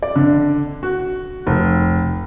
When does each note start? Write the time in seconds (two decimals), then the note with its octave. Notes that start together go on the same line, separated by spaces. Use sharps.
0.02 D5
0.16 D3
0.83 F#4
1.47 F1